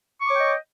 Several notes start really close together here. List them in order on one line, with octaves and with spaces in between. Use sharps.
C#6 D6 C#5 G5 D#5